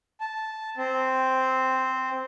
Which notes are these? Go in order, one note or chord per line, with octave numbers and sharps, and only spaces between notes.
A5
C4